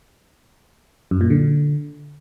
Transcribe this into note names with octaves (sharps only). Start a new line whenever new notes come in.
F#2
A#2
D3